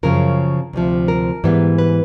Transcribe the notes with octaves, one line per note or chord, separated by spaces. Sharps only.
F#2 C#3 F3 A#4
D2 C3 F3
A#4
G#2 E3 G3 B3
B4